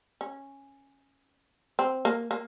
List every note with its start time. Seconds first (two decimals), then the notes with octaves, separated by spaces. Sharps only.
0.21 C#4
1.79 C4
2.05 A#3
2.31 A#3